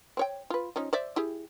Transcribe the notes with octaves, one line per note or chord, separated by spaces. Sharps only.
C4 C#5 G5
F4 B4
F3 C#4 D#4
C5 D5 E5
E4 G4 G#4